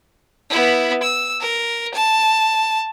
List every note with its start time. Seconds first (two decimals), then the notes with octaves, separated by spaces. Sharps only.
0.50 B3 E4
1.02 E6
1.40 A#4
1.94 A5